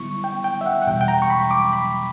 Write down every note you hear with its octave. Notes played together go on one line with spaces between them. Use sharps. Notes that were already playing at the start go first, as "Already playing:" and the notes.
Already playing: D3 G3 B3 E4 C#6
G5
G5
E5
F#5
F#5
E2 B2 G3 G5
G5
A#5
C#6
B5
D6
B5